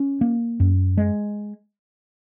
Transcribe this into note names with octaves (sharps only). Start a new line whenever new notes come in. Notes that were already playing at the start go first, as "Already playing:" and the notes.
Already playing: C#4
A#3
F#2
G#3